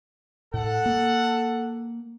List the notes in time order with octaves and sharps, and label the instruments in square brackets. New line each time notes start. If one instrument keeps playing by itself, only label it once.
[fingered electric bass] A2 [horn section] A4 F#5
[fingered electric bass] A#3